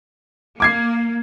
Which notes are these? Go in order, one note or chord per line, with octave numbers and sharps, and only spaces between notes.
A#3 D6 G#6 C7